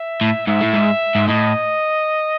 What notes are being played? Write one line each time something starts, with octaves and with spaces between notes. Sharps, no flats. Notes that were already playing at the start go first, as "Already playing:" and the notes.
Already playing: E5
A2
G#2 E5
A2
G#2
G#2
A2 D#5